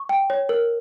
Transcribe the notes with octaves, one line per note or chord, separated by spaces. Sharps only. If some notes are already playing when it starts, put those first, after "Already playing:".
Already playing: C#6
G5
C#5
A#4